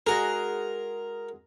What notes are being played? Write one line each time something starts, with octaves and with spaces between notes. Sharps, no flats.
G#3 F#4 G#4 A#4